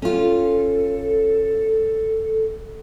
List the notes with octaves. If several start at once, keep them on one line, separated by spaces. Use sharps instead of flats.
C#4 F4 A4